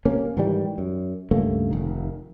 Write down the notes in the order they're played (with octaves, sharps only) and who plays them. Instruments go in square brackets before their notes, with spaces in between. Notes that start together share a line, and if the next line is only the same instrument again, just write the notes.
[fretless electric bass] C3 A#3 C#4
G#2 D#3 E3 G3
F#2
C#2 G2 A3 A#3
F1 D#3